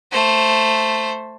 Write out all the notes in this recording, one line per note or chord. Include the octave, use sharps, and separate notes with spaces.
A3 C5